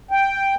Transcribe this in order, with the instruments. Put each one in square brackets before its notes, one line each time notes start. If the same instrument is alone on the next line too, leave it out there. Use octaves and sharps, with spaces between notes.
[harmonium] G5